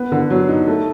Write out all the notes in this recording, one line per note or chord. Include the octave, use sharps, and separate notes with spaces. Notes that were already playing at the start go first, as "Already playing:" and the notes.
Already playing: B3
D3
F#3
D#4
A3